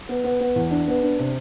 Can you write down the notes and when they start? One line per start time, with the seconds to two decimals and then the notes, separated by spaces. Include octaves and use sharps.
0.09 B3
0.24 B3
0.41 B3
0.56 E2
0.71 D4
0.88 B3
1.03 D4
1.19 C3